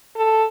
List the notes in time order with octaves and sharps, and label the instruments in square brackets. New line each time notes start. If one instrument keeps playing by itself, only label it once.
[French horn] A4